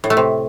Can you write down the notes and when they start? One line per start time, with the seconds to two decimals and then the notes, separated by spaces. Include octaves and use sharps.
0.04 A2
0.10 A3
0.17 C3